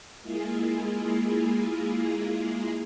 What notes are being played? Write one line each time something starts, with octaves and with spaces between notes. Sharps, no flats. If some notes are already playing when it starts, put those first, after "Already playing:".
G#3 A#3 E4 F4 G#4